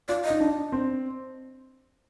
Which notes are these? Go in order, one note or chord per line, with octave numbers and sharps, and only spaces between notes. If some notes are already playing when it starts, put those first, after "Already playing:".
F4 D5
D#5
D#4
D4
C4